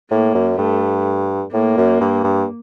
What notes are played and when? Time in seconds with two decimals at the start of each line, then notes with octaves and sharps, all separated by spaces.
0.10 A2 A#3
0.35 F#2
0.58 G2 A3
1.52 A2 A#3
1.77 F#2
2.01 G2
2.24 G2